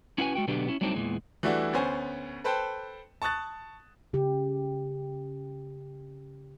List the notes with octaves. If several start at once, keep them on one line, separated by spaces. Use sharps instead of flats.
C#4 E4 F#4 B4 F5 G#5
G#3 F#4 G5
B2 D3 F#3 B3 D4 G4
C#4 E4
F#3 G3 A3 C4 D4 D#4
E2 G2 A#2 E3 G#3
E3 G3 A3 D4 E4 F#4
D2 B3 C#4 C5 G#5
A4 B4 C5 G5 A5
A5 C#6 D#6 F#6 A6
C#3 G4